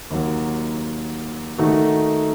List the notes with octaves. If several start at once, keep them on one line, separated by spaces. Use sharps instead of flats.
D#2 D#3 F#3
D#3 A3 D#4 F#4